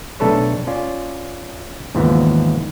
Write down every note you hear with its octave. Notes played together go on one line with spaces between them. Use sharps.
B1 A3 D4 A4 B4 C#5
C#4 F4 D5
D#2 G#2 C#3 E3 F3 B3